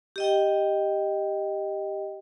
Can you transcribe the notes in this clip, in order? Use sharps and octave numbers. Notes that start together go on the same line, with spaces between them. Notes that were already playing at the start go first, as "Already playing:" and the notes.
G4 D#5 G5